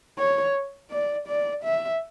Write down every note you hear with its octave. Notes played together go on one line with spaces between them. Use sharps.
C#5
D5
D5
E5